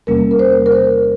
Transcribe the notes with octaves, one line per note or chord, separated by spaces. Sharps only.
E2 C3 G3 A#3 C#4 A#4
A#4
C5
A#4
C5